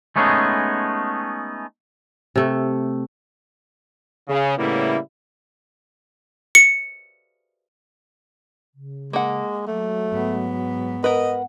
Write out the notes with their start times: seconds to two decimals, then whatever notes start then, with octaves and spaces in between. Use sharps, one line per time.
0.16 G#3 A3 B3 C#4 D#4 G#4
2.36 C3 A3
4.28 C#3
4.57 A2 C#3 G3 A#3 B3 E4
6.55 C#7
8.75 C#3
9.13 G#3 A#3 F#5
9.67 F#3 A3
10.09 G#2 B3
11.04 A#4 B4 D#5 F#5